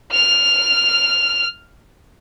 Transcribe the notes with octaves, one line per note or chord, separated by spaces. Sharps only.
F6 F7